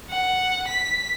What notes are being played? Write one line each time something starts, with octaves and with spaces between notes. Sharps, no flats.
F#5
B6